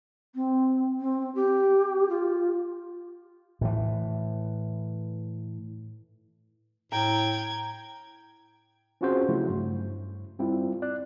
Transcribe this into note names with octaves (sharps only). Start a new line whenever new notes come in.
C4
C4
G4
F4
A2 E3
A2 G5 A#5 G#6
C4 C#4 F4 F#4 G#4 C5
C#3 F3 F#3 A3 E4 F#4
G2
G3 C4 E4 F4
D5 F#6